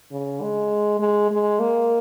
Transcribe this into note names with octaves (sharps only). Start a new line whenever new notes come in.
C#3
G#3
G#3
G#3
A#3